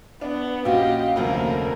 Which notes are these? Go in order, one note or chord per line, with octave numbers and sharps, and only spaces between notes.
B3 D4
A#1 C#4 F#4 G4 D#5 F5
F1 D2 C#3 F3 A#3 A#4